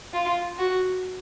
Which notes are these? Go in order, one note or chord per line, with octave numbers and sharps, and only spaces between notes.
F4
F#4